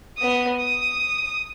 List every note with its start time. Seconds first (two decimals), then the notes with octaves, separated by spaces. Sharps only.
0.18 B3 D#6
0.59 D#6